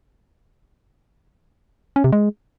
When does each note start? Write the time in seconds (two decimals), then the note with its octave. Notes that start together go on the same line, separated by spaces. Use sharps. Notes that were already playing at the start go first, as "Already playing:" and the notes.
1.96 C#4
2.04 C3
2.13 G#3